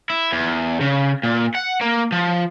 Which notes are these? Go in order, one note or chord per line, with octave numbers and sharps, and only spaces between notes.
E4
E2
C#3
A#2
F#5
A#3
F3